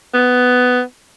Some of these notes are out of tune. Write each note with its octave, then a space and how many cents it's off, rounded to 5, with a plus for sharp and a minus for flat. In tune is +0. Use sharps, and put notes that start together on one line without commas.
B3 +10